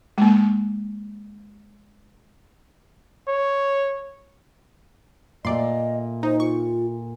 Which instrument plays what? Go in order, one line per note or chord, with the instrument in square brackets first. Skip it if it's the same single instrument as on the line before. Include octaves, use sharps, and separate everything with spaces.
[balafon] G#3 A#3
[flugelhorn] C#5
[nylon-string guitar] A#2 A3 [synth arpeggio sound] D5 C6 [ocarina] D#5
[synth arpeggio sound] D#4 [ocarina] C5
[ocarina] F4 [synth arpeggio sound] C#6